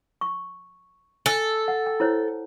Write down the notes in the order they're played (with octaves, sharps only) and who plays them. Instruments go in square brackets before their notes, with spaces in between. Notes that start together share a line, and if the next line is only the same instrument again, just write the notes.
[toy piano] C#6
[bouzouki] A4 [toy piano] G#5
[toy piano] F#5
G5
E4 C5 C#5